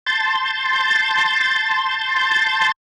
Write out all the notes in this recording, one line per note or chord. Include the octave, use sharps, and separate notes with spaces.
A5 C6 G6 A6